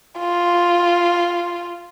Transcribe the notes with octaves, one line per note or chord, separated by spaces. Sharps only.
F4